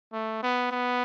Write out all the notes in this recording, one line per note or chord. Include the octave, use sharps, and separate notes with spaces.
A3
B3
B3